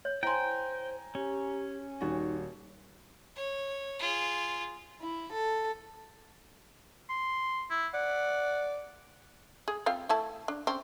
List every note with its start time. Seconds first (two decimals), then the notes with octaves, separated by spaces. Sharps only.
0.05 C#5
0.23 E4 C5 G5 G#5 A#5 C6
1.15 C#4 G4
2.01 D#1 D#4 F#4
3.36 C#5
3.99 F4 G#4
5.00 E4
5.34 A4
7.10 C6
7.70 E4
7.94 D5 F#5
9.68 G#4
9.86 C4 F4 F5
10.09 A3 E4 A5
10.48 D4
10.67 C4 C#4